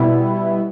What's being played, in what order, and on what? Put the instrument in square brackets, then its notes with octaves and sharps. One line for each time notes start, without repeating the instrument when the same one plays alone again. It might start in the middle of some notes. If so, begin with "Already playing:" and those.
Already playing: [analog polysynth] B2 G3 B3 E4